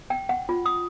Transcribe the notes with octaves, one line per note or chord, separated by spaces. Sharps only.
G5
F#5
F4
D#6